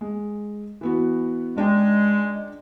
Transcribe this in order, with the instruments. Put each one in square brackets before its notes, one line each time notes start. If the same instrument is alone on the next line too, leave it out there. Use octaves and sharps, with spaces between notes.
[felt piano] G#3
E3 B3 F#4
[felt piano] C#2 D4 G5 [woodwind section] G#3